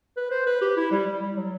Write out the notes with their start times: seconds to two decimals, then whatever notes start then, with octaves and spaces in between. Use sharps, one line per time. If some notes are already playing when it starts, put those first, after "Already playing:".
0.17 B4
0.31 C5
0.47 B4
0.61 G4
0.77 E4
0.91 G3
1.07 G3
1.22 G3
1.36 F#3